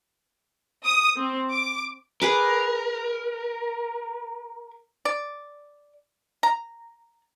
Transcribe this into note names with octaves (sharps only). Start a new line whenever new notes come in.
D#6
C4
D6
G#4 A#4 B4 D6
D5
A#5